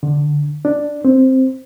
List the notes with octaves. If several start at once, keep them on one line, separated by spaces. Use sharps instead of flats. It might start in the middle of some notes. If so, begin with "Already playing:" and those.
D3
D4
C4